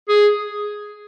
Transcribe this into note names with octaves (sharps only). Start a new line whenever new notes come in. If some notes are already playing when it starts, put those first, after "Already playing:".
G#4